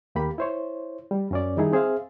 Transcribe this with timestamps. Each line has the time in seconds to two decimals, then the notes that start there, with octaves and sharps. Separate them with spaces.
0.15 D#2 A#3 G4 B5
0.38 E4 C5 C#5
1.11 G3
1.31 F#2 C#4 D5
1.57 D3 D#3 G3 D#4 E4 G#4
1.73 C4 G#4 C5 E5 F5